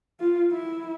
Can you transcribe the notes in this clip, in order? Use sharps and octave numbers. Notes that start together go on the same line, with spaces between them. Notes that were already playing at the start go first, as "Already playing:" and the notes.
F4
E4